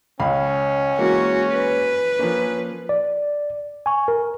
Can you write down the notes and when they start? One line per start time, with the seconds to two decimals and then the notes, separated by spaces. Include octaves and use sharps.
0.20 C#2 C#4 F5 B5
0.98 E3 G#3 A#3 F#4
1.53 B4
2.19 F3 A#3 C#4
2.89 D5
3.86 G#5 C#6
4.08 A#4